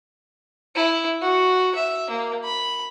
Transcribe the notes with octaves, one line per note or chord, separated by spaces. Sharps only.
E4
F#4
E5
A#3
B5